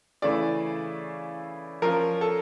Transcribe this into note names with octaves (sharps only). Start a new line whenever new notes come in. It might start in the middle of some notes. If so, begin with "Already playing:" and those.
C#3 E3 A3 E4 D5
F3 C#4 F4 A#4
A4